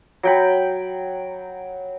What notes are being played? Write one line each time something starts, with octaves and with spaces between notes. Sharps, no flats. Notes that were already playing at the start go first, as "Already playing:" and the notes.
F#3 G5 B5